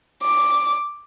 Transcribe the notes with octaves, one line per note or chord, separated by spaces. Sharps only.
D6